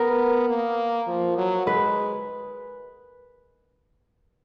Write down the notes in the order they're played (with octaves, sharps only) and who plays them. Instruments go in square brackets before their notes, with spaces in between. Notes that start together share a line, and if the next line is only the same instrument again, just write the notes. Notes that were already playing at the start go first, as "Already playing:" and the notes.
Already playing: [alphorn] B3 [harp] A#4
[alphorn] A#3
F3
F#3
[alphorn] G#3 [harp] B4